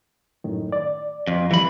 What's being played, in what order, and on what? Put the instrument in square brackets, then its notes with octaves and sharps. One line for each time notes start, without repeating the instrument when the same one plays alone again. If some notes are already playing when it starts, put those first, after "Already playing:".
[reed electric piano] F#2 A2 D#3
D5
[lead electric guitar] F2
[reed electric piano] F2 G3 [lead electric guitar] E3 B5